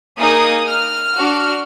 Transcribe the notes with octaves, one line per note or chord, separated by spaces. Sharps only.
A#3 D#4 G#4 D#6
F6
D4 F#4